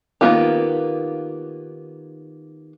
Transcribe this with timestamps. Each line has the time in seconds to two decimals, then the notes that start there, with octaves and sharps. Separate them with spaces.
0.21 D#3 A#3 B3 F4 G4